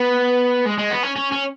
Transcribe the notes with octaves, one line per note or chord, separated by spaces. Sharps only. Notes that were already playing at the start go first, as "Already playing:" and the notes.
Already playing: B3
G#3
G#3
B3
C#4
C#4
C#4